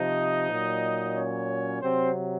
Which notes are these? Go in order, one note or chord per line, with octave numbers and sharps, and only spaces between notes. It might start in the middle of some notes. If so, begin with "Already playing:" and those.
Already playing: C3 F3 D#4 D#5
A#2 F#3
C#4 C#5
C3 F#3 C4 C5